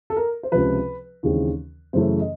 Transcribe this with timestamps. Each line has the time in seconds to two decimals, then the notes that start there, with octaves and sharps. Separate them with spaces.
0.10 A4
0.17 A#4
0.43 C5
0.52 C#2 C3 F3 B4
1.23 D#2 C#3 E3 G#3 C4
1.93 F#2 C#3 E3 A3 C5
2.20 D#5